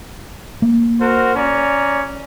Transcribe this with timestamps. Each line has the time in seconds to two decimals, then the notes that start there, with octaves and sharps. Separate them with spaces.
0.62 A#3
0.99 F#4 A#4 C5
1.36 C#4 D5 A#5